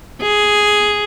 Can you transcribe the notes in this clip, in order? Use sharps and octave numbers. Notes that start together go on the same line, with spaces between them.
G#4